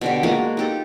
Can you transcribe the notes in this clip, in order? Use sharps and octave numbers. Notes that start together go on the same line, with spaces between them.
B2 D3 G4
G#3 A#3 F4 F#4
D#4 G4 A4